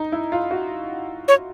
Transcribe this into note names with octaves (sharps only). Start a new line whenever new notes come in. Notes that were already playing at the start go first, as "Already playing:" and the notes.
Already playing: D#4
E4
F4
F#4
C#5